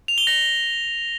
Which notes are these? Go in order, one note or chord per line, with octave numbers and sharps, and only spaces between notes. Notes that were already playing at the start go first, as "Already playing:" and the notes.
F7
G7
A#6